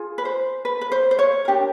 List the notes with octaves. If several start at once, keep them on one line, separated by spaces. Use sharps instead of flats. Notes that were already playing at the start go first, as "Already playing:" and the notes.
Already playing: F4 G#4
B4
C5
B4
B4
C5
C5
C#5
D4 G4 A#4